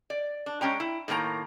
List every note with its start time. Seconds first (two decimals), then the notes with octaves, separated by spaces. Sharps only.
0.10 D5
0.46 D4
0.61 G#3 C#4 G5 A#5
0.80 E4
1.08 A2 D#3 A#3 F4 A#5